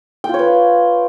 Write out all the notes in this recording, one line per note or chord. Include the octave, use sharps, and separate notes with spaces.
F4 B4 C#5 G5